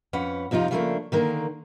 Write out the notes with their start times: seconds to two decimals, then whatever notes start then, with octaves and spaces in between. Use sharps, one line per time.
0.13 F2 C#4 B4 F#5
0.51 F2 C3 F3 D#4 F4
0.71 C#3 F3 G3 A3 A#3 D4
1.12 D3 D#3 A#3